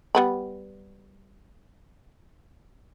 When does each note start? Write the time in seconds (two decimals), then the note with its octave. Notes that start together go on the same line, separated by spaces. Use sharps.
0.15 G3 B3 B5